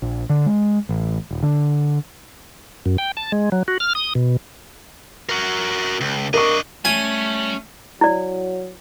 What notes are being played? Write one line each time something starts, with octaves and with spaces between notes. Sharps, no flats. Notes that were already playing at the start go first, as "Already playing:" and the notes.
A#1
D3
G#3
A1
D#1
D3
F#2
G5
A5
G#3
F#3
F#4
F6
D#6
B2
F#4 A#4
C#2
D4 A#4 D#5 C#6
G3 A3 C#4 G#5
F#3 E4 D5